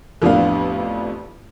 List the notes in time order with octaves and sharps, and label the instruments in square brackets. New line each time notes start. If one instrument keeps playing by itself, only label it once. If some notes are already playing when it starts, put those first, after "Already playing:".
[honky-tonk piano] A1 F2 B3 D4 F5